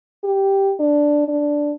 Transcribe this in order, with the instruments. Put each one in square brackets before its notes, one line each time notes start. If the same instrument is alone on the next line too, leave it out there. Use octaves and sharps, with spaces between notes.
[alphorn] G4
D4
D4